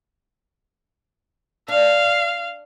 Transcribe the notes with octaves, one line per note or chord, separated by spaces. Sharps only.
D4 F5